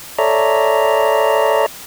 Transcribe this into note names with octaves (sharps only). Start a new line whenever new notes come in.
A4 C#5 D5 E5 A#5